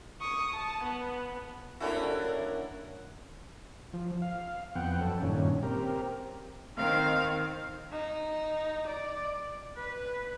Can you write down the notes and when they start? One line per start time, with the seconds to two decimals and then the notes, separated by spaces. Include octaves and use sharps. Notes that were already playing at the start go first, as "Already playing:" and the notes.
0.21 C#6 D#6
0.54 A5
0.83 B3
1.80 A#3 C#4 D4 E4 F#4 G4 A4 A#4
2.24 A#4
3.93 F3
4.22 F5
4.75 F2 B3 F#5 G5
5.01 F#2 A4
5.23 G2 A#2 D#3 C#4
5.63 C4 G4 A#4
6.78 D#3 C4 F5
7.92 D#4
8.88 D5
9.77 B4